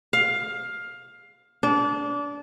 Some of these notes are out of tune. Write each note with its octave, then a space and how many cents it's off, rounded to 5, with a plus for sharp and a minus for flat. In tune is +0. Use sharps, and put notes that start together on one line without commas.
F5 +15
D4 -25